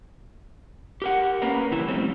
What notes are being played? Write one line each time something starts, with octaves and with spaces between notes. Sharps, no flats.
G4 A#4 F#5
A#3 C#4 A#4 B4
C#3 E3 G3 E4
F2 A2 G3 A3 C4 C#4